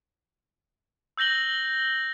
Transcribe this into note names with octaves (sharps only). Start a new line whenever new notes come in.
E6 G6 A#6 F#7 G7